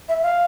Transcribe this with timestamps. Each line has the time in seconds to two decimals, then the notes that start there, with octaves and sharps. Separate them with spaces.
0.09 E5
0.23 F5